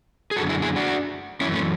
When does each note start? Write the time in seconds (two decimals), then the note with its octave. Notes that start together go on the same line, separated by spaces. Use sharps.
0.31 G#4
0.36 F#2 F#4 A4
0.40 D3
0.49 E4 G#4
0.62 E4 G#4
0.76 D4 F#4
1.41 F#2 C#4 E4
1.45 E3
1.54 A3 C#4